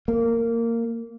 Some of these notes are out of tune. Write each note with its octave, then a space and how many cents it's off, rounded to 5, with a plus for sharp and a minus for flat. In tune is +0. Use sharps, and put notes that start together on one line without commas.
A#3 -15